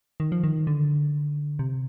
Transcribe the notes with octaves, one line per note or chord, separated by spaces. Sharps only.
D#3
F3
D#3
D3
C3